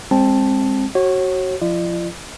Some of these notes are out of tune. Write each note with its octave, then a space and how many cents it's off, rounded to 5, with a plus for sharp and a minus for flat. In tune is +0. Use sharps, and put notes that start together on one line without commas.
G#3 -25 C4 +20 A5 +0
F#4 +20 C#5 -30
F3 +5 F4 -45 D5 +45